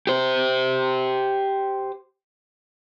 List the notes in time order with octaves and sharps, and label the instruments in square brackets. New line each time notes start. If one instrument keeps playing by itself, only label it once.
[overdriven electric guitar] G4 C5